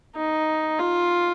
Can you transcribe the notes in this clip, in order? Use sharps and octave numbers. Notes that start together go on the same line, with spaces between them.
D#4
F4